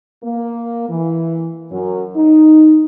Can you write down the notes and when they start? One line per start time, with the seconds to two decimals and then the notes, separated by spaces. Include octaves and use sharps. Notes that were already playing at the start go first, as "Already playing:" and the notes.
0.24 A#3
0.89 E3
1.72 F#2
2.17 D#4